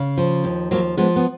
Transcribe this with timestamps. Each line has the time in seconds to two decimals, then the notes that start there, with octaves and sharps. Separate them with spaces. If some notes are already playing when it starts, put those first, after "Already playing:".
Already playing: C#3
0.18 F3
0.44 D#2
0.71 F3 F#3 A#3
0.97 F3 G#3 B3
1.16 B3